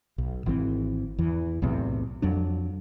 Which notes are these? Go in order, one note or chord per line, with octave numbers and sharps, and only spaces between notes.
B1
G#1 E3 C4
E2 E3
B1 E2 A2 C3
F2 F#3 D4